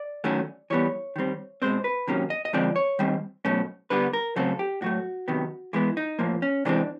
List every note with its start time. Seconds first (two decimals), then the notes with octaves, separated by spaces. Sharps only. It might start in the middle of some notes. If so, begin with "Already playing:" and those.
Already playing: D5
0.24 D#3 F#3 A3 C#4
0.70 E3 G3 B3 C#5
1.16 D#3 G3 C4
1.62 B2 G#3 C4 C5
1.84 B4
2.07 C3 D#3 F#3 A#3 C#4
2.30 D#5
2.45 D#5
2.53 D3 F3 G#3 C4 D5
2.76 C#5
2.99 D#3 G3 C4
3.45 B2 F#3 A3 C#4
3.90 D3 G3 B3 B4
4.13 A#4
4.36 C#3 F#3 A3 C4 A4
4.59 G4
4.82 A2 F#3 A3 F#4
5.28 C3 D#3 F#3 B3
5.73 E3 G#3 B3 E4
5.97 D#4
6.19 A2 F3 A#3
6.42 C#4
6.65 C3 E3 G#3 C4 D4